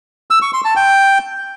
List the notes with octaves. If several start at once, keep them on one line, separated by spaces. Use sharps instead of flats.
E6
C#6
C6
A5
G5